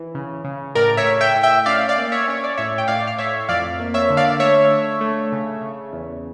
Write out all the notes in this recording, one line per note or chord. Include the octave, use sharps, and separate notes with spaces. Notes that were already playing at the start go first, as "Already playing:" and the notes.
Already playing: E3
C#3
C#3
A2 A#4 D5
C#5 E5
A2
E5 G5
A2
E5 G5
C#4 D5 F5
D5 F5
A#3
C#5 E5
C#4 C#5
D5
A2 C#5 E5
G5
A2 D5 F5
F5
A2 C#5 E5
F2 D5 F5
A#3
C#5 E5
D3
D5 F5
A3 C#5 E5
D4
A3
C#3
C#3
E2